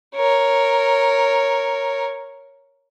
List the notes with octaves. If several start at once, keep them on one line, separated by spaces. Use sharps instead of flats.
A#4 C#5